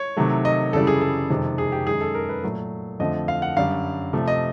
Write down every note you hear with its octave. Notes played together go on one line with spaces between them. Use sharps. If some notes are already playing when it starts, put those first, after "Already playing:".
Already playing: C#5
C3 D#3 F#3 A3
D#5
F#2 C#3 E3 G3 A4
G#4
A4
F2 C3 D#3 G#3
G#4
G4
F#2 D#3 G#3 G#4
A4
A#4
B4
A#2 F#3 A3
F2 D3 F3 A3 D#5
F5
F#5
F#2 D3 G3 F5
C3 F3 A3
D#5